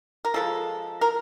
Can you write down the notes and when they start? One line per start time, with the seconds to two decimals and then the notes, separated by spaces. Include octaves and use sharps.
0.25 A#4
0.34 C#3 F3 G#3 A4
1.01 A#4